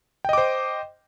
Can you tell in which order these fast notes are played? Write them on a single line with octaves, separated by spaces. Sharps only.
G5 D#5 D6 C5